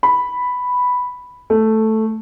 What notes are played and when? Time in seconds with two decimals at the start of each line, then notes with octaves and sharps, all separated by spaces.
0.03 B5
1.50 A3